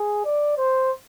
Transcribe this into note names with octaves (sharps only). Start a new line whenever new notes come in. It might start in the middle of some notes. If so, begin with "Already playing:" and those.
Already playing: G#4
D5
C5